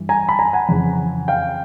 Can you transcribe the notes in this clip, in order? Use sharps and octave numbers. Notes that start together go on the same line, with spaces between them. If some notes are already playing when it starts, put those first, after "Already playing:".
Already playing: G2 E3
G#5 A#5
A5 B5
G#5 A#5
F#5 G#5
F2 C#3 E3
F5 G5